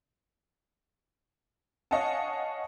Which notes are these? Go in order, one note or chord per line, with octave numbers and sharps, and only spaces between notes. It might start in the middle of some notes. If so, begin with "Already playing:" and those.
C#5 D#5 F5 F#5 G#5 A5